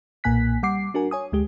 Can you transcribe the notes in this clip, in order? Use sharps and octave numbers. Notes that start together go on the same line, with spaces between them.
B1 A#2 A#3 G#5 F#6 B6
G3 F#5 D6 C7
D4 F#4 A#4 G#5
C#5 G#5 D#6
D2 G#3 G4